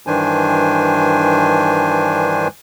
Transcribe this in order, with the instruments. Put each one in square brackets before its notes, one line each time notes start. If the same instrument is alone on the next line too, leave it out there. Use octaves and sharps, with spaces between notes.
[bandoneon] G2 D#3 E3 D4 C5 G#5